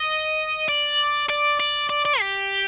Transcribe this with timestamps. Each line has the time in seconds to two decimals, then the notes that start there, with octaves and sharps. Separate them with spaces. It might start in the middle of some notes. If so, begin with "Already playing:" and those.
Already playing: D#5
0.68 D5
1.29 D5
1.60 D5
1.90 D5
2.05 D5
2.20 G4